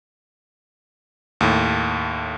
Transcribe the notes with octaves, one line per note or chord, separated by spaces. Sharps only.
D#2 A2